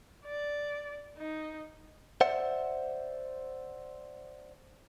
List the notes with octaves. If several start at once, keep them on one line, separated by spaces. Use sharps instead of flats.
D5
D#4
C5 D5 E5 F#5